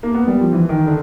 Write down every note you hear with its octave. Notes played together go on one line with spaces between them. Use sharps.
A#3
B3
G3
F3
E3
D#3
D3